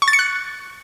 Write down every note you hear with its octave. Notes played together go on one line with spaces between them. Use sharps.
C#6
A6
C#7
F#6